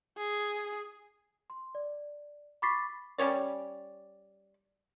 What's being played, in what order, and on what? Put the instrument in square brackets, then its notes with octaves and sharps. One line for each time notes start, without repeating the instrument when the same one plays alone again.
[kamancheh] G#4
[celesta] C6
D5
B5 C#6 D6 A6 B6 C7
[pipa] G3 C#4 C#5 D5